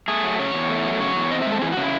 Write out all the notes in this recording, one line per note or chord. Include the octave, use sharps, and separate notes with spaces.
A3 G#4
F#3
C#3 C#5
E2
A3
F#3
C#3 C#5
E2
C4 D#5
G#3 E5
A4
E3 G#4
F#4
C#3 E4